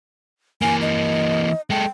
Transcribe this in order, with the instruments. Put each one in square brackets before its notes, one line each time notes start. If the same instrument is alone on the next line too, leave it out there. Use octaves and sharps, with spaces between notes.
[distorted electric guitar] E3 A#3 [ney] G#5
[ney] D#5
[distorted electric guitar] G#3 A4 [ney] G5